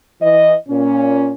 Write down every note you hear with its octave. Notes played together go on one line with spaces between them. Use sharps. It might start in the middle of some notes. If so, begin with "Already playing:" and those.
E3 D#5
A#2 C#4